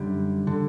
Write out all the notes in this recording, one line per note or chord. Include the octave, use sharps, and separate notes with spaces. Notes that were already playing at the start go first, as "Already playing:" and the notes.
Already playing: F#2 D3 G3
D3